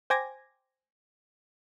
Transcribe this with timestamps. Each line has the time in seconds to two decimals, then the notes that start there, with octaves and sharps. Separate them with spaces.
0.10 C5 G5 G#5 D6 G#6 A#6